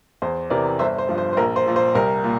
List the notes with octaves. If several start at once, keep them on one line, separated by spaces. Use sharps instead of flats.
E2 C5
C3 E3 A#4 D5
G1 C5 E5
C5
G2 F3
C5
C5
A#1 A#4
C5
A#2 F3
C5
C2 A#4
A#2